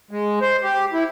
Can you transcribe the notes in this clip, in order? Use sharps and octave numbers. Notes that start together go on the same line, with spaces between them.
G#3
C5
G4
E4